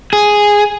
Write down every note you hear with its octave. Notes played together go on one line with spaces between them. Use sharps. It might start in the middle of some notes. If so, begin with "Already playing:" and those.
G#4